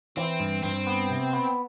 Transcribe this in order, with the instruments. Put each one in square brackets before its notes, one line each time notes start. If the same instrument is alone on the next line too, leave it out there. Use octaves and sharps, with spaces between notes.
[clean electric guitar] E3 [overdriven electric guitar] C4
[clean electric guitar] G2
[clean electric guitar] G2 [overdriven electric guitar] C4
[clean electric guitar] B3
C3
B3